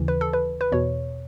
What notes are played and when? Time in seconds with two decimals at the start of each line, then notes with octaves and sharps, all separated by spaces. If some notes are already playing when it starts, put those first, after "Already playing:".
Already playing: D#2 C#3 E3
0.08 B4
0.21 A4
0.33 B4
0.61 B4
0.72 E2 B2 C#5